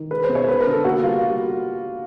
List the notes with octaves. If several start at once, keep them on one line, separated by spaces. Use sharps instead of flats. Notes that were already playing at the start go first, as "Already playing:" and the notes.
Already playing: D#3
G#3 B4
C5
B2
C#5
B3 B4
A#4
D3
A4
A#3 F#4
G3 F4